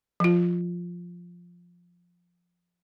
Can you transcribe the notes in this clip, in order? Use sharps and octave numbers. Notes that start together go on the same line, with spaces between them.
F3 F4